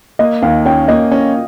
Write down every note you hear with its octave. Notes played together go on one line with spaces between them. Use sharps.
A#3 D#5
D#2 F5
C#4 G5
A#3 D#5
C#4